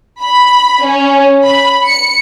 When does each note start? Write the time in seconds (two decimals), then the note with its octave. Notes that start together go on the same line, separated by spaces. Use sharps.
0.21 B5
0.84 C#4
1.44 B5
1.87 C#7